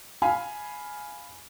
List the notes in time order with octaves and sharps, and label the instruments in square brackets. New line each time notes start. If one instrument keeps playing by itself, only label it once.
[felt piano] F5 G#5 B5